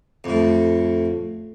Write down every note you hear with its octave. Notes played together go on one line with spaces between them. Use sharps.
F2 A2